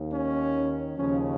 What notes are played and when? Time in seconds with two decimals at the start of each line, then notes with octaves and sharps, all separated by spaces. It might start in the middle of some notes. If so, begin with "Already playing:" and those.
Already playing: D#2 D#3
0.11 C#4
0.98 D#2 C#3 F3 C#4